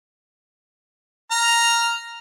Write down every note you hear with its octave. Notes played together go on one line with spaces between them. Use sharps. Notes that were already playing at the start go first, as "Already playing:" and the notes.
A#5 F6